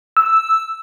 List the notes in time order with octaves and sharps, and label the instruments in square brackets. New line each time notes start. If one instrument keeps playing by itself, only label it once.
[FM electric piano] E6